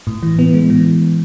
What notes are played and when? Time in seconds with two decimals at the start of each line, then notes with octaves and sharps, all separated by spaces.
0.07 A2
0.23 E3
0.39 B3
0.54 G#3
0.70 E3